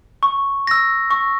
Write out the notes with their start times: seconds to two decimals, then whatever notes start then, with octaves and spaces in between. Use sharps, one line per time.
0.23 C#6
0.67 E6 A#6
1.11 C#6